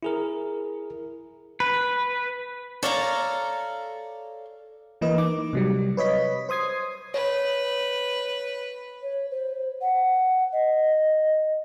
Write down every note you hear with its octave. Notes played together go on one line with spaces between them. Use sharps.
E4 G#4 A#4
B4
A4 C#5 D5 F5 G#5 A#5
E3 A#3 B4 D#5
D#4 D6
C3 F#3 G3
B4 C#5 D#5 B6
C5 C6 D#6 G#6 C7
B4 C#5
C#5
C5
F#5
D#5